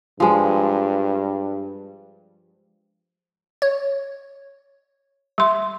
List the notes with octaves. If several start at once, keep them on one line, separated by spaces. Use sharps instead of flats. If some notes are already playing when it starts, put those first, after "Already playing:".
G2 F3 G#3
C#5
G3 C6